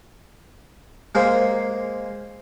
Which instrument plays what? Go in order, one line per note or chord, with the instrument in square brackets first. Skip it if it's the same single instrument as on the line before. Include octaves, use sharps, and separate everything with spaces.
[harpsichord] G#3 A#3 A#4 C5 D#5 F5